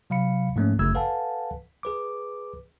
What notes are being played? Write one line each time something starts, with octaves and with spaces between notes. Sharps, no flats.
C3 F#3 F5 B5 C#7
G#2 F3 A3 A#3 C#4
G1 F#2 C#3 A3 E6 G#6
A4 B4 F5 F#5 G#5 A5
G#4 B4 D6